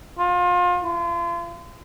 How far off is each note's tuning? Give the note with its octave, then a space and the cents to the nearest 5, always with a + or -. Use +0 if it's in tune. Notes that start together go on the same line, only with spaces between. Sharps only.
F4 +30
F4 -35